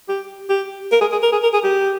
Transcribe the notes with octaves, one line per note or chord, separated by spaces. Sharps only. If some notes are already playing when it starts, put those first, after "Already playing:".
G4
G4
A#4
G#4
G#4
A#4
G#4
A#4
G#4
G4